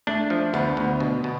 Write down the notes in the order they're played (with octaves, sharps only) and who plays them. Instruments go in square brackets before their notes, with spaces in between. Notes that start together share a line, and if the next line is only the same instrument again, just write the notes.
[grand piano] A3 [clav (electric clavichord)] D4
[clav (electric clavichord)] F3
[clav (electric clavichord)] D2 [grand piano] B3
[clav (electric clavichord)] D2
B2
B2